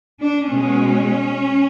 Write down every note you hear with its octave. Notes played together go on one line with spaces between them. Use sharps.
D4
B2 G#3 C#4